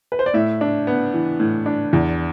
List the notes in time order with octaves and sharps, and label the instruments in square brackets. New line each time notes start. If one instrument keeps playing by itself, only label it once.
[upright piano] B4
C5
D5
A2 E5
D4
B3
E3
A2
D4
E2